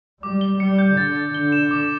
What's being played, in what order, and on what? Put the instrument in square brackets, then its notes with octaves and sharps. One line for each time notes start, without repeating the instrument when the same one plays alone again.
[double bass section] G3 [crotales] D6
[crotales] G7
[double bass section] G3 [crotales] C#7
[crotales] G6
[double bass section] D3 [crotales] A6
[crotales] A6
[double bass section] D3 [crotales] G7
[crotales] E7
D6